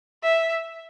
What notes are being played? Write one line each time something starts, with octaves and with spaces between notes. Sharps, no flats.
E5